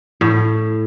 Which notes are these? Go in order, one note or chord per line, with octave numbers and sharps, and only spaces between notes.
A2